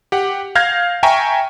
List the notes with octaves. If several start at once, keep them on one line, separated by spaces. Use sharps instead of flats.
G4 F#5
F5 F6 G6 G#6 A#6
E5 G5 G#5 A#5 C#6